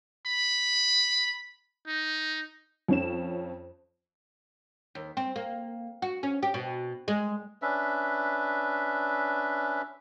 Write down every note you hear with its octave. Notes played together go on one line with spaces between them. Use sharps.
B5
D#4
F2 C#4 E7
D#2
C4
A#3
F#4
C#4
G4
B2
G#3
C#4 D4 B4 E5